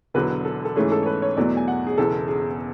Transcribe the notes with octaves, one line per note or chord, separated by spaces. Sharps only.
E1 E2 D3 F#3 B4
A4
A4
G#2 E3 A3 C#4 G#4
A4
C#5
B4
C#5
E2 B2 F#3 A3 D5
G#5
F#5
G#4
E1 E2 C#3 A4
G#4